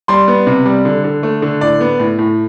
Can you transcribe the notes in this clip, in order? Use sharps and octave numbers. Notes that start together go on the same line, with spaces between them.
G3 C6
B3
C3
G3
D3
D3
A3
D3
A2 D5
B3
A2
A2